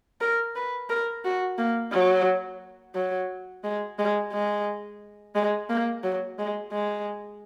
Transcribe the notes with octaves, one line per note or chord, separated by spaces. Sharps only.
A#4
B4
A#4
F#4
A#3
F#3
F#3
G#3
G#3
G#3
G#3
A#3
F#3
G#3
G#3